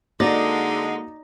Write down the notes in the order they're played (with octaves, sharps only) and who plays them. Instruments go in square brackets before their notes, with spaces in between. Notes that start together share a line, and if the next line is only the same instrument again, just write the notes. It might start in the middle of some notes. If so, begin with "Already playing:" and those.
[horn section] D3 G#3 [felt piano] A#3 F#4 A#6 [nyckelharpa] D#4 [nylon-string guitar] D5